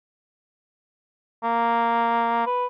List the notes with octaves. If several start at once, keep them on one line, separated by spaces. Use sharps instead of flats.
A#3
B4